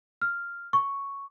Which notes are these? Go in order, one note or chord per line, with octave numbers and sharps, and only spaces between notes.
F6
C#6